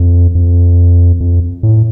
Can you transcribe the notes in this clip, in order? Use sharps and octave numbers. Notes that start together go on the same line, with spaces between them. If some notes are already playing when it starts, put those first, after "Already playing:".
Already playing: F2
F2
F2
A2